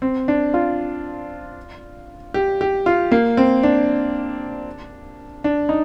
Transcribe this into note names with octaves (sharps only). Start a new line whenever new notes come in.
C4
D4
F4
G4
G4
F4
A#3
C4
D4
D4
D#4